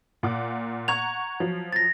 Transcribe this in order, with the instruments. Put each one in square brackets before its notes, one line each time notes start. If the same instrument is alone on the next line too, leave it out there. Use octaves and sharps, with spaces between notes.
[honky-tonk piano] A#2 F#5 D6
[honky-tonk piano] F#5 A#5 C#6 [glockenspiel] G#6 F7
[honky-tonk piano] F3 F#3
[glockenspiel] A6 A#6